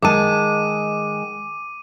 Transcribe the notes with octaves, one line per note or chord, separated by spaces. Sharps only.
D#3 G#3 A5 D6 D#7